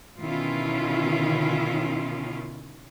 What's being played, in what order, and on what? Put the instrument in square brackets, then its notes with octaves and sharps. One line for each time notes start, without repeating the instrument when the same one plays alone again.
[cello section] B2 D3 D#3 C#4 E4 F4